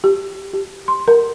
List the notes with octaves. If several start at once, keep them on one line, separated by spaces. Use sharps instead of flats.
G4
G4
C6
A#4